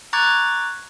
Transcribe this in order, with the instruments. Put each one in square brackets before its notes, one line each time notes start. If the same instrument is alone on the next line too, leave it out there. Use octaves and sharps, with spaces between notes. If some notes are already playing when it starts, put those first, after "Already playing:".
[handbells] A#5 C#6 D6 F#6 G#6 A6